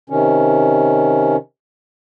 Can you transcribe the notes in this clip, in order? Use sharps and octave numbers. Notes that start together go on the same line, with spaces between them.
C3 D#3 C#4